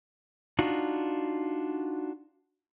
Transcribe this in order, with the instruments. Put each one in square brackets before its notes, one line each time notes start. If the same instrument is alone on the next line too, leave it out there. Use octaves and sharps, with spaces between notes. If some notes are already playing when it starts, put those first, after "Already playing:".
[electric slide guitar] D4 D#4 F4 F#4